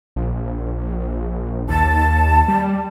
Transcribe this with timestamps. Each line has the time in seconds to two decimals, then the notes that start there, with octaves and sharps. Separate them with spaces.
0.16 A#1
1.68 D#2 A5
2.48 G3